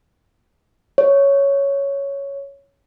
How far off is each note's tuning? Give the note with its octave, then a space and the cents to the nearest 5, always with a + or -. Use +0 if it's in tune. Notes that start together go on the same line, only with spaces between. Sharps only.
C#5 +5